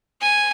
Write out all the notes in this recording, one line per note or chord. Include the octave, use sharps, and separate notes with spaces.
G#5